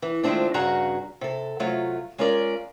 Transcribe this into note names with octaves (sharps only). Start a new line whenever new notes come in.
E3
D#3 F3 G#3 A3 C4 D4
G2 C#3 F#4 G#4 F#5 A#5
C3 A4
C3 F#3 A3 F4
G#3 C#4 F4 A#4 D5